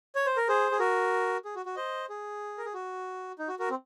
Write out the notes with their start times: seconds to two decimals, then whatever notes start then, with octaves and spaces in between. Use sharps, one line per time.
0.15 C#5
0.26 C5
0.37 A#4
0.49 G#4 C5
0.71 G#4
0.79 F#4 A#4
1.45 G#4
1.56 F#4
1.66 F#4
1.76 C5 D#5
2.09 G#4
2.58 A#4
2.66 G#4
2.74 F#4
3.39 D#4
3.48 F#4
3.59 F#4 A#4
3.70 C4